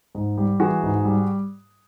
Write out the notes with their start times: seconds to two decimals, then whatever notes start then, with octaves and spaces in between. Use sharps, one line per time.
0.15 G#2
0.37 G3
0.60 E3 F#4 G#4
0.83 G#2
1.05 G3